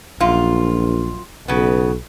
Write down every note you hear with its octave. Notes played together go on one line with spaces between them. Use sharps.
A#1 F#2 F4
B1 C#3 B3